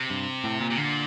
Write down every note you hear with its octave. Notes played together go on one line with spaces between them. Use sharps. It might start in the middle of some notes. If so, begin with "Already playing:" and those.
Already playing: C3
G2
A2
A#2
C3
A#2 D3